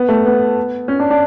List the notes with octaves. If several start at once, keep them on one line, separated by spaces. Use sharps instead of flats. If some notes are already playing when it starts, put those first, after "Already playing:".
Already playing: B3
A3
B3
C#4
D4
D4